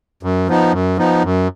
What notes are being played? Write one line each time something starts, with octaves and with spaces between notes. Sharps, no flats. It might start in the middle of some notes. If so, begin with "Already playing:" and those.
F#2
F3 B3 D#4
F#2
F3 B3 D#4
F#2